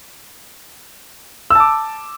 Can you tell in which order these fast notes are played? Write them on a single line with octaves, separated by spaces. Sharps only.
E6 A5 D6